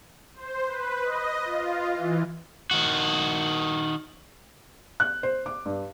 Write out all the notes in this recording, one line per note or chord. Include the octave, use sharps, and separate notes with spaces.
C5
B4
D#5
F4
E3
D#3 F#4
F#6
C5
D6
G2